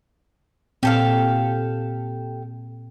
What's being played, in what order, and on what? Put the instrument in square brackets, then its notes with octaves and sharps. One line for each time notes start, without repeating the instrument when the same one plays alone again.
[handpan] A#2 C4 [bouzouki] G4 A4 F5